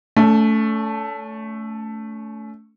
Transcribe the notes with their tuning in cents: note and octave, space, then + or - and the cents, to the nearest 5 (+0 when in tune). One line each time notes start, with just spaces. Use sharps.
A3 +0 C#4 +45